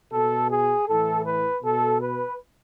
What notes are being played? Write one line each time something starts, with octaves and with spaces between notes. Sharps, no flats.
B2 A4
G#4
A2 E3 A4
B4
B2 A4
B4